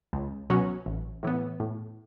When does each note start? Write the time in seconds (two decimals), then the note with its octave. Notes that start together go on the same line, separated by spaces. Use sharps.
0.13 C#2
0.50 B2 F#3 C#4 F#4
0.86 A1
1.23 A2 E3 B3
1.60 A2